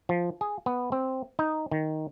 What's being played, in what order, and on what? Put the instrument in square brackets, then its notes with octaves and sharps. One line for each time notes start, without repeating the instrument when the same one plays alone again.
[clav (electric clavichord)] F3
G#4
B3
C4
D#4
D#3